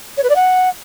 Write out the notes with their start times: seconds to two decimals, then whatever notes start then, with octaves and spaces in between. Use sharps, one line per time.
0.17 C#5
0.23 B4
0.29 D5
0.35 F#5